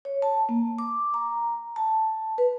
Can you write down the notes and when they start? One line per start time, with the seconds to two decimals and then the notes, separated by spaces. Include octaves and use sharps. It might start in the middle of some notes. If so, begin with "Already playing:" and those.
0.05 C#5
0.22 A5
0.49 A#3
0.79 D6
1.14 A#5
1.76 A5
2.38 B4